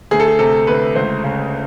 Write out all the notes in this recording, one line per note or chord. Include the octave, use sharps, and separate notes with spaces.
D2 G#4
A4
G#4
C3 A4
D2 B4
C#2 C5
C#3